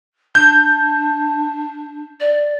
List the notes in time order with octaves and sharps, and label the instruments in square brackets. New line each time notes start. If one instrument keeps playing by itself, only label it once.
[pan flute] D4 [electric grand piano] G6
[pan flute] D5